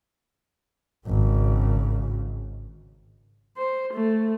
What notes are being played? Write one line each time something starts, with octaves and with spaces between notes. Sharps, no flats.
G#1 C#3
C5
A3